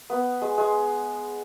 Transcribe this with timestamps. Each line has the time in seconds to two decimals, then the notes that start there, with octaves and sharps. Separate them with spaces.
0.10 B3
0.42 G#3
0.58 G#3